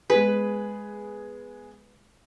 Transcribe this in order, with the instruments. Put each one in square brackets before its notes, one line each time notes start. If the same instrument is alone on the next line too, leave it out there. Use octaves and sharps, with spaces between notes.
[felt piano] G#3 B3 G#4 [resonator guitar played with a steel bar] B4